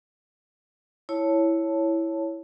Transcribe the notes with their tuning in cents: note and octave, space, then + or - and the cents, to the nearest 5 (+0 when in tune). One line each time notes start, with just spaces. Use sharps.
E4 +0 C#5 +0 A5 +0